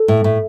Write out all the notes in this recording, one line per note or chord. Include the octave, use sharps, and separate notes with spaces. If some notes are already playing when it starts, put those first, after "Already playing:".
Already playing: A4
A2
A2